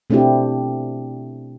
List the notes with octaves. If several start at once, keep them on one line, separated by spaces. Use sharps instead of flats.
B2 A3 C4 D4 E4 G4